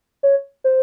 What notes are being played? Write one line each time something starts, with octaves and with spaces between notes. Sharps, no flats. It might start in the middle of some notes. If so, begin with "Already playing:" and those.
C#5
C5